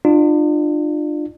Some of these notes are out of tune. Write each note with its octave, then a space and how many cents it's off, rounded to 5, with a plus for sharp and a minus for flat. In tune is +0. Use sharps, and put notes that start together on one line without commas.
D4 +40 F4 +0